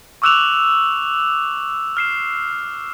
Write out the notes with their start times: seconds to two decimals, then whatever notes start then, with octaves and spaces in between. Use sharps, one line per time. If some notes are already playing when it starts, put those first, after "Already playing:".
0.22 C#6 D6 E6 F#6 E7 F7
1.97 F6 C7 E7